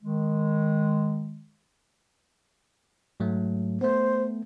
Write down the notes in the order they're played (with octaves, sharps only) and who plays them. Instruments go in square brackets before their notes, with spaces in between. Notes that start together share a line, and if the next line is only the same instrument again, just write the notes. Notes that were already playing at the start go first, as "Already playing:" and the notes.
[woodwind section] D#3 G#3
[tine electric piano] G#2 F#3 A3
[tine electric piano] A3 B3 [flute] C5